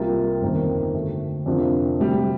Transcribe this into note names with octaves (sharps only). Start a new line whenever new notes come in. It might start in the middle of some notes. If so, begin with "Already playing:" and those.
Already playing: C2 C3 G3 A#3 F4
G1 F2 D#3 A#3
D2 D3 A3
F2 C3 F3 A#3 D4
D2 C3 G3